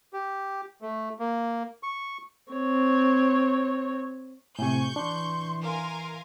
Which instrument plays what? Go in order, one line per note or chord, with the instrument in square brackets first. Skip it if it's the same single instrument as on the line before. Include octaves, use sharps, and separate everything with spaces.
[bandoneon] G4
A3
A#3
C#6
[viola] C4 C#5
[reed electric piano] A2 C3 [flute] G#5 [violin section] C#6 G6
[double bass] E3 [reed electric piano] D4 [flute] C6
[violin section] A#4 F5 G#5